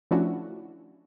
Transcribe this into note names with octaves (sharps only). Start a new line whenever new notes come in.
F3 A3 C#4 D4 E4 F#4